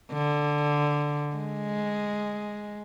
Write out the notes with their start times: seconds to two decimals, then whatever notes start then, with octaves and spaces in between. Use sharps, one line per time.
0.13 D3
1.35 G#3